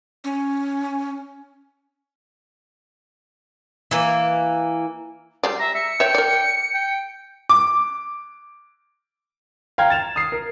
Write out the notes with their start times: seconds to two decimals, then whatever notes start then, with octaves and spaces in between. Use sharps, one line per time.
0.24 C#4
3.91 E3 A#3
5.43 G3 G#3 D5 C7
5.60 E5 A#5
5.75 E5 C#7
6.00 C#5 E5 G5
6.14 A#4 D5
6.74 G5
7.49 D6
9.78 F5 G5 A#5 F6 G#6
9.90 A6 E7 F7
10.16 D#6 C7
10.32 A#4